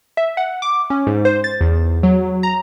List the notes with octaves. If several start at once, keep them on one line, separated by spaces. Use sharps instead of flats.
E5
F#5
D6
C#4
G#2
C5
A6
E2
F#3
A#5